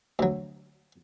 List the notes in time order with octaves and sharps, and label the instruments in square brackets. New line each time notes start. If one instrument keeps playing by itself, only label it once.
[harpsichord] D2 F#3